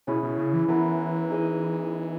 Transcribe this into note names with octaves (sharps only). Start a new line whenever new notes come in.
B2 C#4 E4 G#4
B2
C#3
E3
E3 B3 E4 A#4
D#4 G#4 D#5